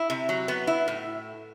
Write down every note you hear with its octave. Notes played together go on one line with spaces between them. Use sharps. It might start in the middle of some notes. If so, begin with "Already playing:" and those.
Already playing: E4
C3
F#3
B3
E4
A2